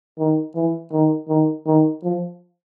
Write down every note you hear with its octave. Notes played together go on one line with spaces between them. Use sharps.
D#3
E3
D#3
D#3
D#3
F3